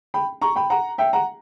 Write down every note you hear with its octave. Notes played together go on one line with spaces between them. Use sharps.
G5 B5
A#5 C#6
G5 B5
F#5 A#5
E5 G5
F#5 A#5